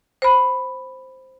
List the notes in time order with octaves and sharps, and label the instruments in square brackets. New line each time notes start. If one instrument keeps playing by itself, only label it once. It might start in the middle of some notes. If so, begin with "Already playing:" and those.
[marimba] C5 B5